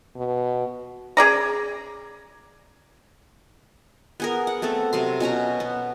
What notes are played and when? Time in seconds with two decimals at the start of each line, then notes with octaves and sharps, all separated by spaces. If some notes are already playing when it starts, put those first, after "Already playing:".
0.15 B2
1.17 C#4 G#4 D5 A#5
4.20 B3 G#4 A#4
4.47 F#5
4.62 A3 B3 C4 A4
4.93 C3 F#3 C6
5.20 B2 C#4 F#4 A#5
5.60 B3